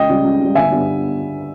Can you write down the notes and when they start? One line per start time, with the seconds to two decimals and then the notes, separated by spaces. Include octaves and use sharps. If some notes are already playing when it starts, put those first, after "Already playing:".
Already playing: C#2 D#5 G5
0.09 C#3 G3
0.24 C#2
0.40 C#3 G3
0.55 G1 E5 G#5
0.71 G2 G3 B3